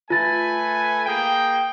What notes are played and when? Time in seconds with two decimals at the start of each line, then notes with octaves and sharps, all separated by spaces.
0.10 A3 F4 B4 G#5 A6
1.06 A#3 G#4 G5 D7